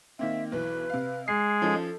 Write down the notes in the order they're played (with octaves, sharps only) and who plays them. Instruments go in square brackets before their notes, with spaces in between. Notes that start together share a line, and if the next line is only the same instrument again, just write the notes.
[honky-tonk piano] D#3 A#3 C4 [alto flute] E5
[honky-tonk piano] B1 E3 [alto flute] B4
[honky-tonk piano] C3 F5
[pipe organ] G#3 G#4 [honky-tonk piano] C7
[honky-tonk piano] F3 C#4 D#4 [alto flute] A4